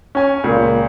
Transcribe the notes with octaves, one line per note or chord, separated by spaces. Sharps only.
C#4 G#5
C#2 A#2